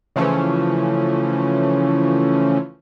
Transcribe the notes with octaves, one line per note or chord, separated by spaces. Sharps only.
C#3 E3 F3 A3 C#4